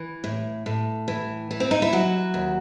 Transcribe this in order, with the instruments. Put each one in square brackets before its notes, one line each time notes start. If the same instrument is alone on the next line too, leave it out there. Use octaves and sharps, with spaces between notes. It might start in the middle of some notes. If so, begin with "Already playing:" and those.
Already playing: [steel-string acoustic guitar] E3
A2
A2
E3
E3
C4
D#4
E4
F#3 F#4
D#2